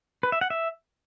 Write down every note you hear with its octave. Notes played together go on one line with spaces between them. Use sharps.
B4
E5
F#5
E5